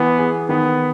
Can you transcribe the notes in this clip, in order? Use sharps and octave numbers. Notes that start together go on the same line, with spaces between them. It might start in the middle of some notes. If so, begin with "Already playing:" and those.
Already playing: E3 B3
G#4
D#3 B3